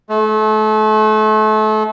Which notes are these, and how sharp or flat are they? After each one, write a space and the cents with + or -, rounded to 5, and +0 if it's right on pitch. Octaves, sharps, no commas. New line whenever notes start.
A3 -35